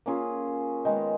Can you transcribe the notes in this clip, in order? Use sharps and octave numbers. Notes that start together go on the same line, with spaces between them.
A#3 C#4 F4 G#4
D#3 G#3 B3 D#4